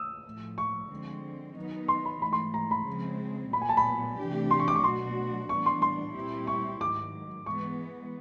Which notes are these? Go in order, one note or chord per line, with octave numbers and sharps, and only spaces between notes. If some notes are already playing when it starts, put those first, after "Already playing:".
Already playing: D#6 E6
A2 F3 A3
C#6
D3 F3 G#3 C4
D#3 F#3 B3 D#4
C6
B5
G#2 E3 A3 B5
C6
A#5
B5
C#3 F3 G#3 C4
A#2 F#3 B3 B5
G#5
A5
B5
C3 E3 A3 D4 G4
C6
C#6
D6
C#6
B2 F#3 A3 D4 F#4 C6
A2 E3 G3 B3 D4 C#6
C6
C6
A#2 G3 C4 E4 G4
C#6
G#2 D#3 F#3 D6
E3 G#3 B3 C#6